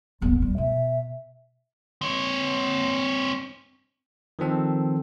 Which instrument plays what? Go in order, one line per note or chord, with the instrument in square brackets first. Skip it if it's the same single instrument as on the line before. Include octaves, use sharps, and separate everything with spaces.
[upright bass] D#1 G#1 [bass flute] B3
[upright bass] D#2 [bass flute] G3
[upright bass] B2 [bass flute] E5
[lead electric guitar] C4 C#5
[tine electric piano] D#3 F3 C4 A4